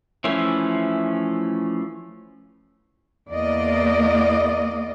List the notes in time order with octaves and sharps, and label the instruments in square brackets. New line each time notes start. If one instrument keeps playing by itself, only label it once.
[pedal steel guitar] E3 F3 A3 C#4 E4
[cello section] E2 A#3 D5 D#5